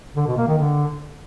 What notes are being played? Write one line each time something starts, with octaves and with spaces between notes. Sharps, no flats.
D3
B2
A#3
D#3
D3